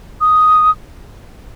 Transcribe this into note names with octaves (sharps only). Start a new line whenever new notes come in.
D#6